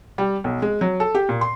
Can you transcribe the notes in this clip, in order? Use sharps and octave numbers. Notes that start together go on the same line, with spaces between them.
G3
B1
G#3
F#3
A4
G4
A#2
C6